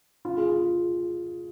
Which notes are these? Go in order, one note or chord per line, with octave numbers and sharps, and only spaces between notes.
F4
G#4
F4